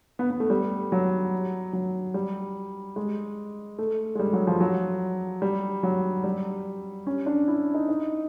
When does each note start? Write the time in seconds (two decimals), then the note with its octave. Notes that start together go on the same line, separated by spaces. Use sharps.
0.19 B3
0.31 B3
0.40 A3
0.50 G3
0.92 F#3
1.73 F#3
2.14 G3
2.96 G#3
3.79 A3
4.15 G#3
4.19 G3
4.33 F#3
4.47 F3
4.60 F#3
5.42 G3
5.83 F#3
6.24 G3
7.07 C#4
7.26 D4
7.48 E4
7.74 D#4
7.89 D#4